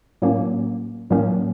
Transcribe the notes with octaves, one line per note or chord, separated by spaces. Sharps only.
A2 F#3 A#3 C#4
A2 F#3 A#3 C#4